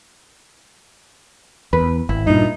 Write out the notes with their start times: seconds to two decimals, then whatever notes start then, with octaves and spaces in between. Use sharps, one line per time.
1.73 E2 B4
2.09 G#1 E4
2.27 G2 A#2 D#4